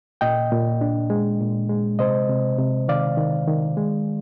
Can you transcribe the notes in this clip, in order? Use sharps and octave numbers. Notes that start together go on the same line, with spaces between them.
A#2 D#5 G5
A#2
D4
G#3
A#2
G#3
C3 C5 D#5
C3
C3
D#3 D5 F5
D#3
D#3
G#3